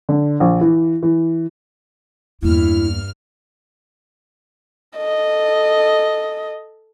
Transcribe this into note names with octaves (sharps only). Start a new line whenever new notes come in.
D3
A#1
E3
E3
E2 G2 A#3 E4 F6
A4 D#5